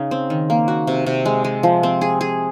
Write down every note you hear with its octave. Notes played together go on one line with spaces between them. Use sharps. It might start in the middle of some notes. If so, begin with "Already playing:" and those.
Already playing: C#3 D#4
C4
D#3
A#3
F#4
C3
C3
G#3
G#3
F3
C4
G#4
G#4